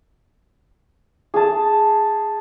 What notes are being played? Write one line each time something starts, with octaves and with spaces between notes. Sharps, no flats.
G#4 A5